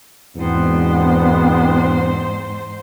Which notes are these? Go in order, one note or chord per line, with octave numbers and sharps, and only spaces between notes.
E2 G#2 B2 B3 C4 D4 C5